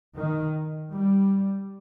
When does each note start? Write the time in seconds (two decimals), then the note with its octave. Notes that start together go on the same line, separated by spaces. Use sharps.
0.17 D#3
0.92 G3